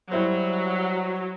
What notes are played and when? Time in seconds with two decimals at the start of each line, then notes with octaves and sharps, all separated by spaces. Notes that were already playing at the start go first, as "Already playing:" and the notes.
0.11 F#3 G3 E4 C5